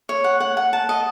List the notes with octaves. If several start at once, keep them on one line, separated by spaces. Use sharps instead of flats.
C#5
F#5
F#5
F#5
A5
D#5